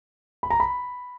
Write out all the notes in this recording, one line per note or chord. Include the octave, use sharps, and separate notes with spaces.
B5
A#5
B5